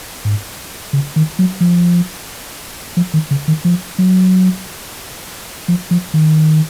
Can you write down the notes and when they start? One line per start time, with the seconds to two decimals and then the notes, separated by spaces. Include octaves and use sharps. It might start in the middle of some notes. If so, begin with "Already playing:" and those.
0.25 G#2
0.93 C#3
1.16 D#3
1.39 F#3
1.60 F3
2.97 F3
3.14 D#3
3.31 C#3
3.48 D#3
3.65 F3
3.98 F#3
5.68 F3
5.91 F3
6.14 D#3